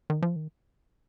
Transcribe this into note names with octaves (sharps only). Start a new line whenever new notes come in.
D#3
F3
D#3